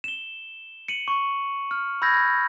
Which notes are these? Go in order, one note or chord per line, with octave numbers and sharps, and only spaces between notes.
E7 G7
C#7 D#7 F#7
C#6
F6
B5 E6 G6 G#6 A#6